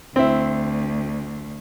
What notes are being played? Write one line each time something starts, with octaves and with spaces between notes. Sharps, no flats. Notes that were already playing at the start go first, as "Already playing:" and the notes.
D2 C4 E4